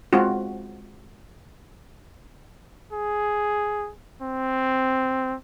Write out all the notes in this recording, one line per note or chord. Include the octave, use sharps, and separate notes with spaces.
G#3 C4 F4 F#4
G#4
C4